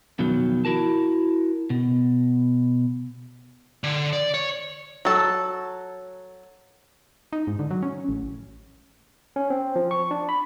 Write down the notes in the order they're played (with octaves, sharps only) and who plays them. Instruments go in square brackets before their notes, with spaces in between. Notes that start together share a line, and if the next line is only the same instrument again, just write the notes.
[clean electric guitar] F2 B2 D#3 F#3
E4 F#4 A#4 A5
B2
[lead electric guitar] D3
D5
C#5
[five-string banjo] F#3 A4
[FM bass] D#4
G#2
D3
F#3
C#4
A1
[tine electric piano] C#4
C4
F3
C#6
D4
B5